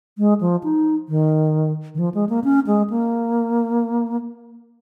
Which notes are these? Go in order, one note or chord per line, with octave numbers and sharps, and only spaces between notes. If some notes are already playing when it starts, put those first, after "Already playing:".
G#3
F3
D#4
D#3
D#3
F3
G#3
A#3
C#4
G#3
A#3